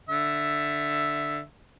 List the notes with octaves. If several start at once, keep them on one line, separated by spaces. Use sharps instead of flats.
D3 E5